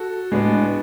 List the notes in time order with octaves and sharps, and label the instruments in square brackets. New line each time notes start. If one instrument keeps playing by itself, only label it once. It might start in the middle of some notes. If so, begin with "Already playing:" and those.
Already playing: [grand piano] F#4 A4
A2 G#3 B3 D4